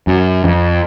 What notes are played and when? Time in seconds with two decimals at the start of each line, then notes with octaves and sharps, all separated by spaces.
0.07 F#2
0.44 F2